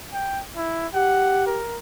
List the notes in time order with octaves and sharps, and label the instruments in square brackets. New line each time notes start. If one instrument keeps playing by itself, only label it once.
[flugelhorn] G5
E4
[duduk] G4 [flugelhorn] F#5
[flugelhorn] A#4